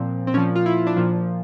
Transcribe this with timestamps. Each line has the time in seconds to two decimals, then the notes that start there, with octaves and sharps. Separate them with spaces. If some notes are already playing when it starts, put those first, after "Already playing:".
Already playing: A#2 F3 C4
0.27 C4
0.34 A#2 F3 C#4
0.55 F4
0.66 E4
0.87 D4
0.96 A#2 F3